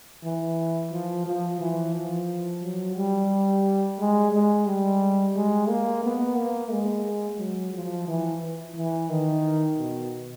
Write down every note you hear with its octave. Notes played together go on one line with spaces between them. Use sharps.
E3
F3
F3
E3
F3
F#3
G3
G#3
G#3
G3
G#3
A#3
B3
A#3
G#3
F#3
F3
E3
E3
D#3
B2